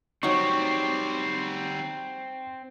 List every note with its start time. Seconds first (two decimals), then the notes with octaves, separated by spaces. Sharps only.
0.23 F#3 G3 C4 D#4 F#4 C#6